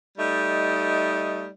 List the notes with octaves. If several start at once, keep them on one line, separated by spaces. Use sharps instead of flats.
G3 A3 D#4 D#5